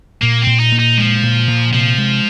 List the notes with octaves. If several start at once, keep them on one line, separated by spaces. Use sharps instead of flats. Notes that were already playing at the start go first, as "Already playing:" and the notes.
A#2 A#3
C4
A#2
D#4
A#2
D#4
F3 G#3
A#2
A#2
C3 F3
G#3